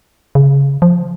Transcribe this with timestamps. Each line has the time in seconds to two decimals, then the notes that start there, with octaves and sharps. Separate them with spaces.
0.35 C#3
0.82 F3